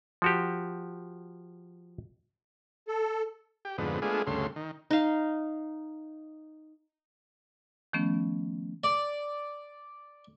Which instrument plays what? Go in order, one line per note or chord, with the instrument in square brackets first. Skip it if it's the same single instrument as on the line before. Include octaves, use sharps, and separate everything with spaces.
[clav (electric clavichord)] F3 F#4 G4
[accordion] A4
[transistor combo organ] G4
F2 G#2 D3 B3
G#3 A3 B3 D4 F4 G#4
D2 G2 C#3 A3 C6
D#3
[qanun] D#4 F5
[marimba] D#3 F3 A3 B3 C#4
[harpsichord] D5